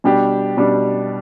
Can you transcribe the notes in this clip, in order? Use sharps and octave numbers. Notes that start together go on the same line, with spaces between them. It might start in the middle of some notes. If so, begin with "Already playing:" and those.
B2 G3 D4 G4
B2 G3 D4 G4